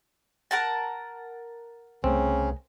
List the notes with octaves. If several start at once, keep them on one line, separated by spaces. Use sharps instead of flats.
A#4 F#5 A5
C2 C#3 A3 C4 C#4